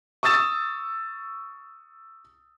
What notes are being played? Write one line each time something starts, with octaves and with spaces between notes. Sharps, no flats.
C#6 D#6 E6 A6 E7